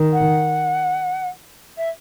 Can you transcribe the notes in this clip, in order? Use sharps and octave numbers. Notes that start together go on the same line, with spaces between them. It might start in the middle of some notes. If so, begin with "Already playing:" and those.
Already playing: D#3
F#5
E5